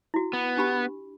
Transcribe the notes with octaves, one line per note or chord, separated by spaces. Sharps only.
E4 F#4
B3
D4 G4 B5